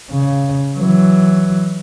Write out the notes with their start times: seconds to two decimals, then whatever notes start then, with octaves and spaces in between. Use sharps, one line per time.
0.11 C#3
0.77 E3 F#3